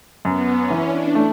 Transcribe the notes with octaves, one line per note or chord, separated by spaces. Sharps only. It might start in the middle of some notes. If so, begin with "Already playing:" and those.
F#2 B3
C#4
E3
D4
A3